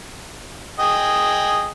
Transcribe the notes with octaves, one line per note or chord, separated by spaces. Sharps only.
G#4 D#5 G5